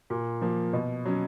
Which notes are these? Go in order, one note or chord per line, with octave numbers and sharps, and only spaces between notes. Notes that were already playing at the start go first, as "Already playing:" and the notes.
A#2
F3 A#3
B2
F#3 C#4